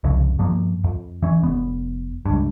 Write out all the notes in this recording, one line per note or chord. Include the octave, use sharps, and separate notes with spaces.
C2 F2 C#3
G2 F3 A#3
F2
E3 C#4
F1 B3
C#2 G2